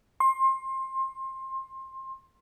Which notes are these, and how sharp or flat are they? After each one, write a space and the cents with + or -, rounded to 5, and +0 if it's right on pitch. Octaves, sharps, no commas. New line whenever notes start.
C6 +25